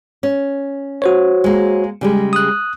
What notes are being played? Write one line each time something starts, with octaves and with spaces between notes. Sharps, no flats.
C#4
F#4 C5 C#5
G#3 A#3
C#3 G3 G#3
D#6 F#6